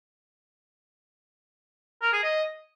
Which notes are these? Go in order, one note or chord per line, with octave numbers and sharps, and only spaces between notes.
A#4
G#4
D#5